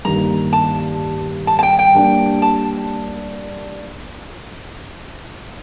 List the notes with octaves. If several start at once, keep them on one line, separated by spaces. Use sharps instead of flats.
G2 D#3 A#3 A#5
A5
A5
A5
G5
G5
G3 A#3 D4 G4
A5